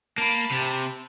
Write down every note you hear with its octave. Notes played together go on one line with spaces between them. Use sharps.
A#3 A5 B5
C3